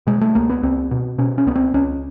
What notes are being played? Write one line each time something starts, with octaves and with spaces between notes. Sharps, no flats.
B2 G#3
A3
C#2 A#3
B3
C#2 C4
B2
B2 C#4
C#4
C#2 B3
C4
C#2 C#4